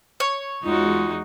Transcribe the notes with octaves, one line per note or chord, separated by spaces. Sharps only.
C#5
E2 G#3 D#4 F4 F#4